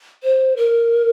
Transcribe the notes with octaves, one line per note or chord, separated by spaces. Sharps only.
C5
A#4